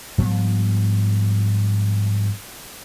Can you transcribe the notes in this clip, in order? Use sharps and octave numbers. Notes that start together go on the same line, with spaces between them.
G#2 F3 G3 B3